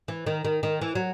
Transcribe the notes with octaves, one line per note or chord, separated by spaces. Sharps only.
E3
D#3
D#3
D#3
E3
F#3